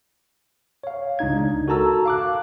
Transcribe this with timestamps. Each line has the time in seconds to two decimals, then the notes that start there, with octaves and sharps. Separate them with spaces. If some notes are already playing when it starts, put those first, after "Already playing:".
0.84 C#5 F5
1.19 C#2 D4 D#4 G#6
1.68 F#4 A4 A#4 A5 A#5 E6
2.05 F5 D6 F#6